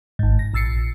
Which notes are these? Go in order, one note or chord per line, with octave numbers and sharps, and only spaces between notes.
G#1 G#2
A#6
A#1 E6 A6 C7 C#7